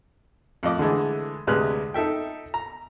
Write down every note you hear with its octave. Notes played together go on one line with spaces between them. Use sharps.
F2 A3 D#5 D6
D3 E3 G#3 A3
D2 C3 G#3 B4 F6 F#6
D#4 A4 E5 G5
A#5